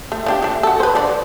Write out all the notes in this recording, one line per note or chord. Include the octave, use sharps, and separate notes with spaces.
A3
F3 D4 G4
A3 D4
F#4 A4
B4 C5
F3 D4 D5